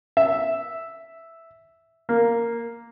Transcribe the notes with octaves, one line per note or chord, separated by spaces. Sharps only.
E5
A#3